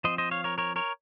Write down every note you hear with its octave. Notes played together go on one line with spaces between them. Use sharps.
F3 C4 C5 D#5
C5 D#5
C#5 F5
A#4 C#5
A#4 C#5
A#4 C#5